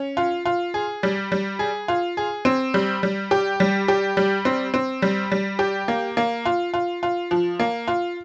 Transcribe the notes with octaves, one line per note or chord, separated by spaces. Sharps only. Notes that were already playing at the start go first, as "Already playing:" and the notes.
Already playing: C#4
F4
F4
G#4
G3
G3
G#4
F4
G#4
C4
G3
G3
G4
G3
G4
G3
C4
C4
G3
G3
G4
A#3
A#3
F4
F4
F4
F3
A#3
F4